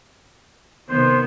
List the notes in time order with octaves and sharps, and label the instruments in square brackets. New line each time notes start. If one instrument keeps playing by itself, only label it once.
[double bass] C3 D#3 [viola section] B3 [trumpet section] C5